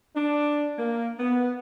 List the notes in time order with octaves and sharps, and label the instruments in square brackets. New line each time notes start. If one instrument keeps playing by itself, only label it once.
[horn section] D4
A#3
B3